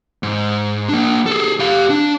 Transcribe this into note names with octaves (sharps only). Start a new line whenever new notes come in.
G#2
A#3 D4
G#4 A4
G4 F5
D4